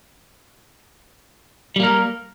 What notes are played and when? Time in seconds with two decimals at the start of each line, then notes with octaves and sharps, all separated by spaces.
1.76 G3
1.80 A#3
1.83 A#4